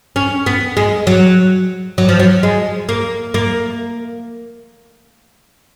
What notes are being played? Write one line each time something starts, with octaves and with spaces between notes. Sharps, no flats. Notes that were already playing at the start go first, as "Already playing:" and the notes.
C#4
B3
G#3
F#3
F#3
F3
F#3
G#3
A#3
A#3